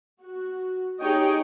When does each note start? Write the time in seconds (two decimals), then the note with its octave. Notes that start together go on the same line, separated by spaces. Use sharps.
0.22 F#4
1.02 D#4 G4 G#4 C#5 D#5 G5